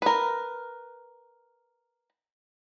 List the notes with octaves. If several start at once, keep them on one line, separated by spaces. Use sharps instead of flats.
A#4 B4